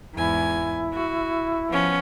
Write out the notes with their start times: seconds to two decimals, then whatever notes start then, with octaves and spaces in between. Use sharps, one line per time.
0.14 E2 G#2 E4 G#5
0.93 F#4
1.69 F3 B3 C#4